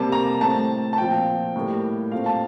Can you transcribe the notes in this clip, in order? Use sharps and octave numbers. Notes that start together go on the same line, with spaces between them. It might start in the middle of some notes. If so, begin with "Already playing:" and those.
Already playing: C3 G3 A#3 A5
A#5
A2 A3 C4 A5
A5
A#2 F3 C4 G5
A2 G3 A#3
A#2 A3 C4 F5
A5